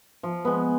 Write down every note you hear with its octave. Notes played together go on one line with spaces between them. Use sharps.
F3
G#3 B3